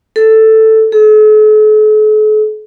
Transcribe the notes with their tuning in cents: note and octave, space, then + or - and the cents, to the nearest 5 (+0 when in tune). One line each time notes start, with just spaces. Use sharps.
A4 +5
A4 -45